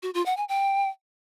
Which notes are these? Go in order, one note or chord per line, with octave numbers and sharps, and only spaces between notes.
F#4
F4
F#5
G#5
G5